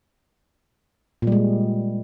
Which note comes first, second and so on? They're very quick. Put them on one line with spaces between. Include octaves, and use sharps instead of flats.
A#2 G3 G#3